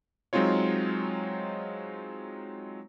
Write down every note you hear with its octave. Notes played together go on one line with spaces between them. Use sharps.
F#3 G#3 C4 D#4 F4 C#5